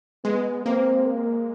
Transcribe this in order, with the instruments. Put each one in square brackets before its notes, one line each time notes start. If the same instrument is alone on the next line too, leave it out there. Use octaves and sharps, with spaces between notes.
[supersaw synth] G#3 [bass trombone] B3
[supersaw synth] A#3 [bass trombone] C4
[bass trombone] A#3